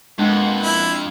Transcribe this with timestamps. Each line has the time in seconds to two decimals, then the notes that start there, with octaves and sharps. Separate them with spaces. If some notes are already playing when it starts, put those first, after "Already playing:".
0.19 F2 B2 G#3 A#3 D4 F#5
0.60 E4